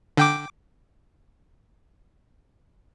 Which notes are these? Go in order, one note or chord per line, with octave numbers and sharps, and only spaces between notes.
D3 G5 D6